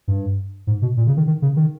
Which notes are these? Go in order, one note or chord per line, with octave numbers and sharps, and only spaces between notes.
G2
G#2
B2
A#2
C#3
D#3
D#3
C#3
D#3